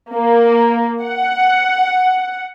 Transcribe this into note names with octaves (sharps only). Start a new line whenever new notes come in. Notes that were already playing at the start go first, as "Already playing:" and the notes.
A#3
F#5